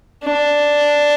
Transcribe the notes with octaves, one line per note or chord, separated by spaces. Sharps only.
D4